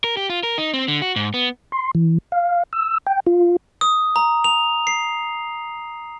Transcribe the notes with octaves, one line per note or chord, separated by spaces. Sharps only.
A#4
G4
F4
A#4
D#4
C4
D3
F#4
G#2
B3
C6
E3
F5
E6
G5
F4
D#6
A#5
F7
C7